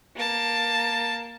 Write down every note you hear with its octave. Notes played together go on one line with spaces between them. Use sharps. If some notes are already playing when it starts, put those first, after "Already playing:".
A#3 A5